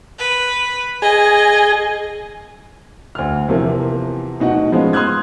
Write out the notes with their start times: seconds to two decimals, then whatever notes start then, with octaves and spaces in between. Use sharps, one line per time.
0.19 B4
1.02 G#4 D#5
3.15 D2 F6
3.48 E2 C3 E3 F3 A#3
4.39 D1 B2 D#4 F#4 F#5
4.72 F3 G#3 B3 C#4 F4
4.93 C6 D#6 F6 F#6 G#6